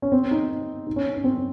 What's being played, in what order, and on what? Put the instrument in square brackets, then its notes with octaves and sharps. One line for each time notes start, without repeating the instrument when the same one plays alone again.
[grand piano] C#4
C4
D#4
D#4
C#4
C#4
C4